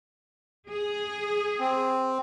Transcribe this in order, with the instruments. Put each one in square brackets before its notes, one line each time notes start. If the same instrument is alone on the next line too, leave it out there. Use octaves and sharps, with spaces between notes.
[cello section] G#4
[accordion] C4